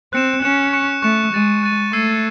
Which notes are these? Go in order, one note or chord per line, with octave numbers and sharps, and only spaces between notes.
C4 F#6 C#7 E7
C#4 F#6 C#7 E7
C#6 F#6 C#7 E7
A3 C#6 F#6 C#7 E7
G#3 F#6 A6 D#7
F#6 A6 D#7
A3 C#6 E6 G#6 C7 D#7